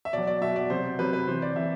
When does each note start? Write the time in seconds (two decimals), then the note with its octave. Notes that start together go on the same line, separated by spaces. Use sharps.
0.05 E5
0.13 B2 F#3 D5
0.27 D5
0.41 B2 F#3 E5
0.56 D5
0.70 C3 F#3 C5
0.99 C3 F#3 B4
1.13 B4
1.28 C3 E3 C5
1.42 D5
1.56 C3 E3 E5